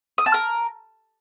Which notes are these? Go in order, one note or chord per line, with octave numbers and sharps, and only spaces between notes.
D#6
A5
A#4